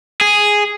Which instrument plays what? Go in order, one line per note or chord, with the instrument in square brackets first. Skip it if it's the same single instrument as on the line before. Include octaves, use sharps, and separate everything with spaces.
[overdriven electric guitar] G#4